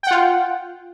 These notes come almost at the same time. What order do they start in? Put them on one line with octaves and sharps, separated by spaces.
G5 F#5 F4